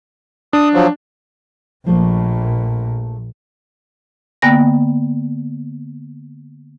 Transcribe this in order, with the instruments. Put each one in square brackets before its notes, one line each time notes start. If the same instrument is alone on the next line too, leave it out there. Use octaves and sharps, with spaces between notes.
[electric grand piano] D4 [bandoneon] D#6
[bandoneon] F3 F#3
[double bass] A#1 A#2 [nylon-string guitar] F3 A3 A#3
[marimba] D3 A#3 B3 G5 G#5 A#6